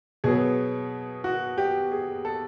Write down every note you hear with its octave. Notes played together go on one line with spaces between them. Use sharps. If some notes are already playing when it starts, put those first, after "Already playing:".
B2 F#3 B3 G#4
F#4
G4
G#4
A4